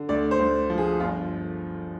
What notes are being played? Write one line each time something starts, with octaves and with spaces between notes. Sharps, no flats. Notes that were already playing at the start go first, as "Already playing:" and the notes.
Already playing: D3
D2 D5
C5
D2
F3
G#4
G1 F4